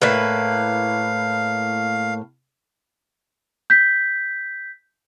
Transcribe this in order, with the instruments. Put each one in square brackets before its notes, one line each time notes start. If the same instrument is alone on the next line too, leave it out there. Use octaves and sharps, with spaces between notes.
[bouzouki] A2 A#3 B4 [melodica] F5
[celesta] G6 B6